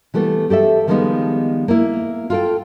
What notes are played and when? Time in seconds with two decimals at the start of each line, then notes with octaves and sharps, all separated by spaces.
0.14 E3 G3 A3 B3
0.50 G4 A4 D5 E5
0.87 D#3 F3 G3 G#3 B3 D#4
1.68 A#3 E4
2.30 F4 A4 G5